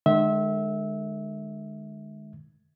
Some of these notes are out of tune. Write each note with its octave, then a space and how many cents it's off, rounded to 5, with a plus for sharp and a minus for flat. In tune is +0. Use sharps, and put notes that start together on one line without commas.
D#3 -45 G#3 +10 E5 -20